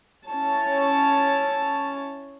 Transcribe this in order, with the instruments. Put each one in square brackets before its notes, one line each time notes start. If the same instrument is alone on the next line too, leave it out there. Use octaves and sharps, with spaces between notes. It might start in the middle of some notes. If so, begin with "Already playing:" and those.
[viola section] C#4 E4 C#5 A5